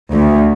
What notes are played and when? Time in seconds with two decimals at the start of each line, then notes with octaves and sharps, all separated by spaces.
0.14 D2